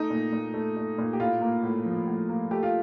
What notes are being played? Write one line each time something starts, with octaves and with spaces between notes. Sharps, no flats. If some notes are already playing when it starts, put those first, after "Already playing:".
Already playing: A3 D#4
A#2
A#2
A3
A3
A#2
G4
A2 F4
A#3
A2
F3
A2
A#3
A3 G4
F4